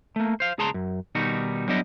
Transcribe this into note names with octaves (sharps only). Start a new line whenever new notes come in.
A3 A#3
C5 F5
C#2 G#4 A5 A#5 C6
F#2
B2 D#3 G3 D#4 F#4
F#3 G3 B3 D4 E4 D#5